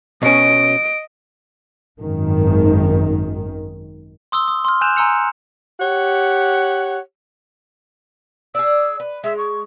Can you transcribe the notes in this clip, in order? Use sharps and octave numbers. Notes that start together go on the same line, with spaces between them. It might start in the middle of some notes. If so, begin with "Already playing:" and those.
B2 C#4 D#5 D7
G#1 F#2 D#3
C6 D#6 E6 G7
D#6
C6 F6
G#5 F#6 G6 E7 F7
G#5 A#5 C6 E6 C#7 F7
G4 C#5 F#5
G#4 D5 E6
B4
G#3 E5
C#6